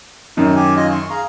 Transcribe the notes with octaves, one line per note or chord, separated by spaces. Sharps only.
F#2 D#3 D#4
G4 G#5
F4 D#5 G#5
C6 C#6
G#4 F5 A#5